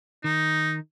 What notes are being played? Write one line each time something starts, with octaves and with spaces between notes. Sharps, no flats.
D#3 D#4